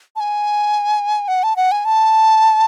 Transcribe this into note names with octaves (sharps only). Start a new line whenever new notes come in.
A5
G#5
F#5
A5
F#5
G#5
A5